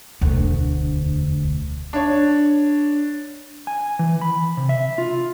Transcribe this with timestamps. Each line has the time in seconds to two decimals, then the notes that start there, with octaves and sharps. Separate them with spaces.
0.21 E1 D2
1.93 D4 C#5
3.67 G#5
3.99 E3
4.21 B5
4.57 C3
4.69 E5
4.98 F4